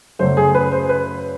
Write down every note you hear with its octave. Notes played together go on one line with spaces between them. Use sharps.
F#2 C#3 F#3 A3 C5
G#4
B4
C5
B4